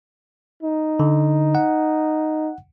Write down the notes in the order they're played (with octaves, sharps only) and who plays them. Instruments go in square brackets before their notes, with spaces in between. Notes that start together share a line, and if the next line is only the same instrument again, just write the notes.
[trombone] D#4
[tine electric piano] D3
F#5